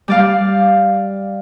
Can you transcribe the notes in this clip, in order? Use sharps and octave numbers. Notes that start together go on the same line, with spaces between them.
G3 D5 F5